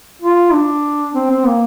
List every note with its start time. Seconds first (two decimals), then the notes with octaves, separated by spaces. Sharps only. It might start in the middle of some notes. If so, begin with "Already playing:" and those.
0.22 F4
0.53 D4
1.15 C4
1.30 C4
1.46 A#3